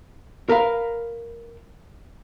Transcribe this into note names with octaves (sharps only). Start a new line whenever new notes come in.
A#4 B4 F5